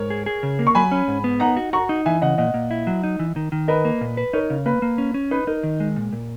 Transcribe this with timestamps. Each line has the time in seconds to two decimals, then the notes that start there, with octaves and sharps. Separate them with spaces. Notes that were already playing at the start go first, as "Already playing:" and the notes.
Already playing: G#2 A#4 C#5
0.10 G#4
0.26 G#4
0.43 C#3
0.59 A#3
0.67 C#6
0.75 F#3 G#5 B5
0.92 C#4
1.08 G#2
1.24 B3
1.40 D#4 F#5 A#5
1.57 F#4
1.73 F#4 A#5 C#6
1.89 D#4
2.06 E3 E5 G#5
2.22 C#3 D#5 F#5
2.38 A#2 D#5 F#5
2.54 A#2
2.71 E4
2.87 F#3
3.03 D#4
3.19 E3
3.36 D#3
3.52 D#3
3.68 A#4 B4 D#5
3.85 A#3
4.01 A#2
4.17 B4
4.33 D#4 A#4 C#5
4.50 C#3
4.66 A#3 B4
4.82 A#3
4.98 C#4
5.14 C#4
5.31 D#4 B4
5.47 D#4 A#4
5.63 D#3
5.80 G#3
5.96 A#2
6.13 A#2